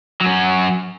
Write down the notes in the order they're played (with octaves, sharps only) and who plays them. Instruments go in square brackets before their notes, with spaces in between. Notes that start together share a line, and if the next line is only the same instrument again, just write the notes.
[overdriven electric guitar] F#3 C#4